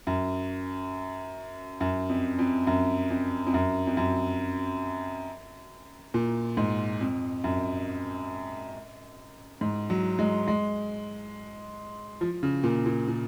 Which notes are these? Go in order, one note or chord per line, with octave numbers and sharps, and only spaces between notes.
F#2
F#2
F2
F2
F#2
F2
F2
F#2
F2
F#2
A#2
G#2
F2
F#2
G#2
F#3
G#3
G#3
F3
C#3
A#2
A#2
A#2